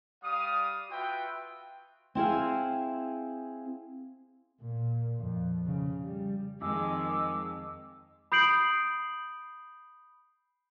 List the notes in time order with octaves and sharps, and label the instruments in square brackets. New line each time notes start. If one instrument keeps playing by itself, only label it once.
[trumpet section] G3 F5 D#6
F4 F#4 B4 E5 G5
[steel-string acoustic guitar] C4 E4 G#4 F5
[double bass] A#2
F2
C#3
G3
[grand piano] F2 [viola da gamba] D#3 G#3 [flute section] G#5 D6 E6
[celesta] B5 D#6 G6 C7 D7 F#7